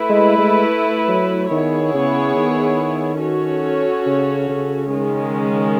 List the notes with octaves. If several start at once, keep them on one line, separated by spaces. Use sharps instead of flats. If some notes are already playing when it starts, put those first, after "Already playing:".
Already playing: A3 E4 B4
G#3
G#3
F#3
D#3 B3 E4 G#4 C#5
C#3
D#3
C#4 F#4 A4 C#5
C#3
C#3
D#3 G#3 C#4